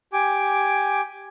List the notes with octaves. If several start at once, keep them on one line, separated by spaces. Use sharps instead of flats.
G4 G#5 D6